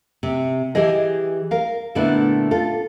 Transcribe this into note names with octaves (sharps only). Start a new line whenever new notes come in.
C3
E3 G4 G#4 D#5
A#4 F5
A#2 D3 A3 B3 D4 E4
F4 A4